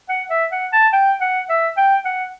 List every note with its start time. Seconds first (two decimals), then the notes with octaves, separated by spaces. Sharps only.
0.09 F#5
0.30 E5
0.52 F#5
0.73 A5
0.93 G5
1.21 F#5
1.49 E5
1.77 G5
2.05 F#5